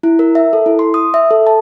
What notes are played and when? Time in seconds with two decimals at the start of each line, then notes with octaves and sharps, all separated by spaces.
0.03 E4
0.19 A#4
0.35 E5
0.53 A4
0.66 E4
0.79 C6
0.94 D#6
1.14 E5
1.31 A4
1.47 A5